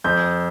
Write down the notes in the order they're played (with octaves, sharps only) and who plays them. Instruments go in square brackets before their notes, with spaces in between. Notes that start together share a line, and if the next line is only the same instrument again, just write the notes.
[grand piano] F2 G6